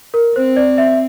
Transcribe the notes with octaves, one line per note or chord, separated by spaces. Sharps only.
A#4
C4 C5
D5
E5